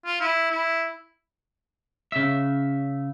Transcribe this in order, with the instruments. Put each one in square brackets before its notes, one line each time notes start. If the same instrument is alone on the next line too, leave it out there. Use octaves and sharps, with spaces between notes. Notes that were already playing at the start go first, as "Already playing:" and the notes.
[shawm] F4
E4
E4
[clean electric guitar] C#3 E5